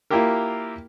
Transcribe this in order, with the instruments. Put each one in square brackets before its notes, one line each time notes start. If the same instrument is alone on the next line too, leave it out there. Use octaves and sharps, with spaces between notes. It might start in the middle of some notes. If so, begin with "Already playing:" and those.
[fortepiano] A#3 E4 F4 G4 A#4